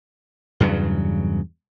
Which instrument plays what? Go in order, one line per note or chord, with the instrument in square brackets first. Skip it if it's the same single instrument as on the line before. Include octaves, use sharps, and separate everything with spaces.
[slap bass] E2 G2 C#3 F#3